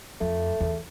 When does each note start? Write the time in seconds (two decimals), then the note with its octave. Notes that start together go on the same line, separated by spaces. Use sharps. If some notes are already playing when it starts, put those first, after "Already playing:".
0.21 F2 A3
0.60 E2